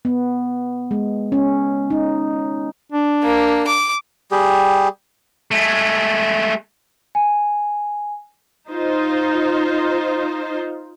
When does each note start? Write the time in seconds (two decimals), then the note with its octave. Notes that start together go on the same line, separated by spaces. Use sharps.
0.05 B3
0.91 G#3
1.32 C#4
1.90 D#4
2.92 D4
3.23 A#3
3.67 D6
4.31 G3 G4 G#4
5.51 G#3 A3
7.15 G#5
8.70 D#4 F4 C5